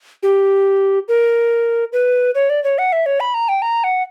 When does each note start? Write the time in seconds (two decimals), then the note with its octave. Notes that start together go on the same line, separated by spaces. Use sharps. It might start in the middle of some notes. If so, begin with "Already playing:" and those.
0.23 G4
1.08 A#4
1.93 B4
2.35 C#5
2.50 D5
2.64 C#5
2.78 F#5
2.93 E5
3.06 C#5
3.20 B5
3.34 A#5
3.49 G5
3.62 A#5
3.84 F#5